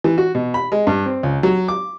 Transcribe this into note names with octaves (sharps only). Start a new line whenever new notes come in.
E3
F#4
B2
B5
G#3
G2
C4
C#2
F#3
D6